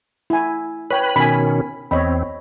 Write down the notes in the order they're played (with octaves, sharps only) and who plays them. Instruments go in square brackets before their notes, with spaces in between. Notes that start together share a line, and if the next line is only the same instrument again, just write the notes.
[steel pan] E4 G#5
[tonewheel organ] B4 B5 [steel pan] C#5 G5
[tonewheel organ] B2 D#3 C#4 [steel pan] G#5 B5
[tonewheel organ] E2 C4 [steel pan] C#5 D#5 B5